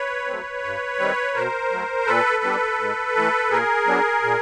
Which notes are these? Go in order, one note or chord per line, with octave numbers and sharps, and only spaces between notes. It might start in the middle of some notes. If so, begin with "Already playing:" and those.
Already playing: B4 C#5
F#3 A3 C4
G2
D#3 G3 C4
B2 A#4 C5
F#3 A3
A#2 A4 B4
G3 B3 D4
G#2
E3 A3
A#2 G#4 A#4
F#3 B3 D4
A#2